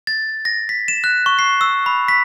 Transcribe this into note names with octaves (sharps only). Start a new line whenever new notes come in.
A6
A#6
B6
E7
F#6
C#6
C7
E6
B5
B6